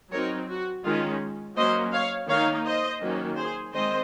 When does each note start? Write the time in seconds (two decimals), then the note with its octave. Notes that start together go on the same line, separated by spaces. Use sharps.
0.12 F#3 C4 D#4 A#4 C#5
0.49 F#4
0.85 D#3 G#3 C#4 F4
1.57 F#3 A#3 C#4 C5 D#5
1.92 C#5 F5
2.28 D#3 A#3 D#4 C#5 F5
2.66 C5 D#5
3.01 D#3 F#3 A#3 C#4
3.37 G#4 C5
3.73 D#3 G#3 C4 C5 D#5